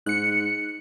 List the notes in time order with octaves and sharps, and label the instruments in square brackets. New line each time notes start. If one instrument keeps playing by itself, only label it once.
[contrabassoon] G#2 [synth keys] F#6 C#7